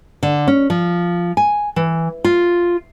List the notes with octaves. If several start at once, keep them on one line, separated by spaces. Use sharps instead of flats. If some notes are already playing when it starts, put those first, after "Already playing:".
D3
C#4
F3
G#5
E3
F4